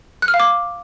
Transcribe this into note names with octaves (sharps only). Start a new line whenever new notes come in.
F#6
F6
F5
D6